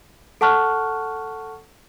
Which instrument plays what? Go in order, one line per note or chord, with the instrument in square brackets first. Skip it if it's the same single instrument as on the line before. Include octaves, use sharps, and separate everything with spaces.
[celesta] A4 F#5 A5 C#6 F6 F#6